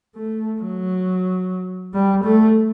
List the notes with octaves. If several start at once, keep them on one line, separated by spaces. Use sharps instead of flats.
A3
F#3
G3
A3